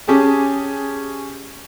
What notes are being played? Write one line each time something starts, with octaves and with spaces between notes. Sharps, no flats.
C#4 G4 G#4 A5